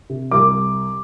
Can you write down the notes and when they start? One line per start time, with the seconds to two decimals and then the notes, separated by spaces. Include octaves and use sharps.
0.10 C3
0.31 C2 D6